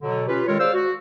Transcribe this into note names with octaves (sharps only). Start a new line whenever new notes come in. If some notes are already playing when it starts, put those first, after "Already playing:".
B2 D3 F#3
C#4 F4 G4 B4
D#3 G#3 F4 A4 A#4 C#5
G#4 C5 D5 F5 E6
F#4